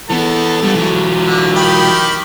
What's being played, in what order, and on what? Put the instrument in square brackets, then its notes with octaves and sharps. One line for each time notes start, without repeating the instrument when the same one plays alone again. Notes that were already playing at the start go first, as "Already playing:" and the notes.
[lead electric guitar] E3 B3 [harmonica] A4
[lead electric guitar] G3 B3
E3 F#3
[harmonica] D3
D#3 G4 B5